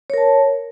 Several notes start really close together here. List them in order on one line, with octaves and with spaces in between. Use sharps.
C#5 A#4 A5